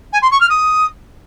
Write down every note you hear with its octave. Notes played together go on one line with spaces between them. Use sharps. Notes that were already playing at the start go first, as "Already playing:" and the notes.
G#5
C6
C#6
F6
D#6